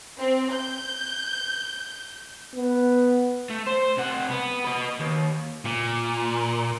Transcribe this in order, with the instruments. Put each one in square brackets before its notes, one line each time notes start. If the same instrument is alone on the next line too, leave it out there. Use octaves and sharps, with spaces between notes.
[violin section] C4
G6
[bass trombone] B3
[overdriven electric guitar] A3
C5
C3 F#5
B3
B4 D#5
D#2
[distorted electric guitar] A#2